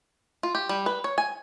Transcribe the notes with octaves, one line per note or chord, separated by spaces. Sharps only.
F4
G4
G3
B4
C#5
G#5